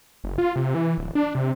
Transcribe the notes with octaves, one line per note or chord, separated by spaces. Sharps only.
F#1
F4
C3
E3
D1
D4
C3